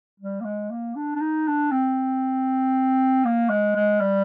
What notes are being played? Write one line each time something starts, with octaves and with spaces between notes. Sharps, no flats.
G3
A#3
G#3
A#3
D4
D4
D#4
D4
C4
A#3
G#3
G#3
G3